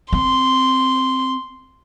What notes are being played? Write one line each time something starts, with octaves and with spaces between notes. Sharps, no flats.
C4 C6